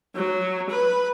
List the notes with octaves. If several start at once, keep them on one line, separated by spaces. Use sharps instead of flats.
F#3
B4